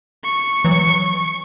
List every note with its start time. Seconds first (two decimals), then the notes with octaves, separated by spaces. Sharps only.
0.24 C#6
0.65 E3 F#3